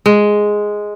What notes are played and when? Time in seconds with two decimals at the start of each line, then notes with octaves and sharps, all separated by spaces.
0.06 G#3